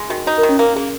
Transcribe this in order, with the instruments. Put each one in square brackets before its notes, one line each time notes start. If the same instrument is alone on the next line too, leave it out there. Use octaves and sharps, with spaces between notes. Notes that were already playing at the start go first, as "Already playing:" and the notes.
Already playing: [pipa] G#3
[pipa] D#3 [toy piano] F#4
[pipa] D#4 [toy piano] F#4
[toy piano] A#4
[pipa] D#3
[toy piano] C#4 C#5
[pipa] A#3 [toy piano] A#4
[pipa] A#3 [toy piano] G#4